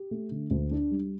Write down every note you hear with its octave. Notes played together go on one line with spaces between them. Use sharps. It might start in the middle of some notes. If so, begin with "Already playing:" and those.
Already playing: G4
A3
D3
D2
D4
G3